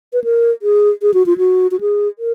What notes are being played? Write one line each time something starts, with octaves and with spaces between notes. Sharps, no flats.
B4
A#4
G#4
G#4
F#4
F4
F#4
F#4
G#4
A#4